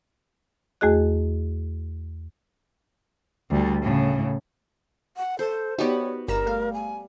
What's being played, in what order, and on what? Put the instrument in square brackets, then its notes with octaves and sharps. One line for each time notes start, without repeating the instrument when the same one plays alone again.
[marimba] E2 A3 F#4 G#4 D#5 F#6
[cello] D2 G3
A2 C#3
[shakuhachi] F#5
[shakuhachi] A4 [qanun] C5
[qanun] B3 F#4 [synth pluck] D#4 G4 D5 [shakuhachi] C#5
[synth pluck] G1 A#5 E7 [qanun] G3 [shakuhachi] A#4
[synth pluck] A3 F5
[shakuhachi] G#5